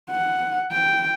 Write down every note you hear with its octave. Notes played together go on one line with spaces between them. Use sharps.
F#5
G5